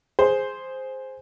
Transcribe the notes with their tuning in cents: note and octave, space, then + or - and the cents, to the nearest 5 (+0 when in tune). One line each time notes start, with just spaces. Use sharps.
G#4 +0 C5 +0